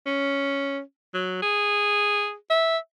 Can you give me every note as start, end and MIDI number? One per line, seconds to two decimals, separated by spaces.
0.06 0.81 61
1.14 1.42 54
1.42 2.34 68
2.50 2.78 76